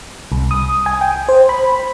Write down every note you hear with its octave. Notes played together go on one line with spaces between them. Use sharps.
C2
D#6
G#5
G5
C5
B5